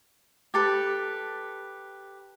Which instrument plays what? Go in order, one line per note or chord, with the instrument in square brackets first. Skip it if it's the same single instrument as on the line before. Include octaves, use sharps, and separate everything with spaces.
[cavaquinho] G4 A4 B4